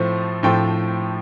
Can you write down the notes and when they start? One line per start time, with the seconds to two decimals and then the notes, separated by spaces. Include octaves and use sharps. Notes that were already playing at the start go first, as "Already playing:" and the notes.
Already playing: A2 F3 A3 C4
0.43 A2 F3 A3 C4 G5